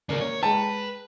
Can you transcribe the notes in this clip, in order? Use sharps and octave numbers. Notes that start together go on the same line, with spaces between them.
D#2 C#3 A#4 D5
A#3 C#5
G#3 B4 G5 A5